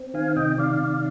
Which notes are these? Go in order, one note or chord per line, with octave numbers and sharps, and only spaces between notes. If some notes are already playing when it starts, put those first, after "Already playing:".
Already playing: C4
D#3 F5 G#5
C3 D#5 G5
D#3 D5 F5
C3